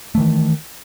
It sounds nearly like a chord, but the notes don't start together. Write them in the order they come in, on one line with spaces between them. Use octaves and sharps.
A3 E3 D#3